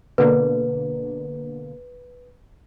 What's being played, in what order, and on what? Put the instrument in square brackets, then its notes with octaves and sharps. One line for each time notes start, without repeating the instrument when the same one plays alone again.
[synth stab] B2 D3 A#3 [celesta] B4